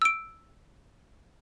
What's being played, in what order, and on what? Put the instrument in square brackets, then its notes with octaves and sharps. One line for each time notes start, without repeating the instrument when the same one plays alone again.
[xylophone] E6 D7